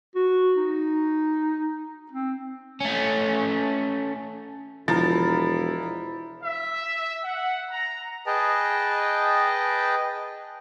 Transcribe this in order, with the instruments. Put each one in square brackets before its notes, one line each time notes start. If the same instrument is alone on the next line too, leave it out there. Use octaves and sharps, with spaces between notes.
[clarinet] F#4
D#4
C4
[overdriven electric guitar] A3 C#4
[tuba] E1 [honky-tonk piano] F3 [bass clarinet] E4 [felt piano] A#5 A6
[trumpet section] E5
F#5
A#5
[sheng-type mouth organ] G#4 B4 D#5 G5 A5